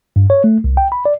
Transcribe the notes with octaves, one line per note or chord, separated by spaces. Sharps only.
G2
C#5
A3
C2
G5
B5
D5